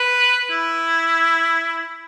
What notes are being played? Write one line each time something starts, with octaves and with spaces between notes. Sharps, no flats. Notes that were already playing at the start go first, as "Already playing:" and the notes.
Already playing: B4
E4